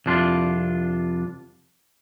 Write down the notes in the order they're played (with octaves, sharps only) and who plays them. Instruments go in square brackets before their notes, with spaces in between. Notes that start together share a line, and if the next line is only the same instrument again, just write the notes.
[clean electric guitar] C2 F2 D4 F4